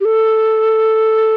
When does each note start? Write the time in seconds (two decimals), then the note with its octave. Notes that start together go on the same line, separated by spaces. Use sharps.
0.01 G4
0.05 A4